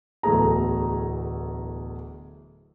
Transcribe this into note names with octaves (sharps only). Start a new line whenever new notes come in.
D1 E2 A3 G#4 A#5